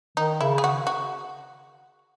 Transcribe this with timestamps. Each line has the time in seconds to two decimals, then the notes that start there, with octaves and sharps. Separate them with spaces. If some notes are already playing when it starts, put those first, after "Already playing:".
0.17 D#3 D#4
0.41 C#3 E4
0.58 G#4
0.64 F#4
0.87 F#4